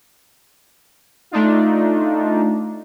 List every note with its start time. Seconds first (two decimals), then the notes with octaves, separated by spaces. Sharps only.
1.31 A3 D4 D#4 F4